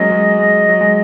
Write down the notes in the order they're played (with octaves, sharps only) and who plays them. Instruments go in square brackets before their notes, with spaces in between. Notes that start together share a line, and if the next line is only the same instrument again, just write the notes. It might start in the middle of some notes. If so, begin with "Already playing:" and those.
Already playing: [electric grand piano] F#3 G#3 A#3 C#4 [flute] D#5
[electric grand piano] G#3
G#3
F#3
G#3